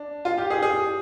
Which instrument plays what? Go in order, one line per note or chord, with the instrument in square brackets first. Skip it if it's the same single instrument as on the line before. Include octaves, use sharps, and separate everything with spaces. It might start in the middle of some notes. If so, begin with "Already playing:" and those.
Already playing: [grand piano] D4
F4
G4
G#4
G#4